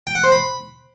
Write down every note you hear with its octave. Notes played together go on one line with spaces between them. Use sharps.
G5
F#5
C5
B5